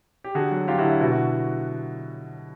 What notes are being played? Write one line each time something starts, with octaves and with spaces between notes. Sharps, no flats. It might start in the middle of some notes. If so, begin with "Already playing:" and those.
G4
D3 F#4 G#4
F#3
F#3 F4 G4
E4 F#4
D3
E4
B2 E4 F#4
E4 F#4